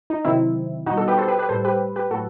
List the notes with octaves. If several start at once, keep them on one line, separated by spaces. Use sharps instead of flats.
D#4
C3 D#3 F#3 C4 E4
B2 G3 D#4 F#4
F#4 A4
G4 B4
A4 C5
G4 B4
G4 B4
A2 G3 A4 C5
G4 B4
G4 B4
A2 F#3 F#4 A4